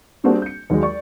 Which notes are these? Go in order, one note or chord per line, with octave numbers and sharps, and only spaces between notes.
G3 A#3 C4 D4 F#4 G#4
G6 C#7
D#2 F#3 G#3
D5 C#6